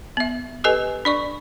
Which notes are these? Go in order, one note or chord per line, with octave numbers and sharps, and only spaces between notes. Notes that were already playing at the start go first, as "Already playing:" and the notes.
B3 E5
G4 A4 B4 D#5 G#5
D4 D5 C#6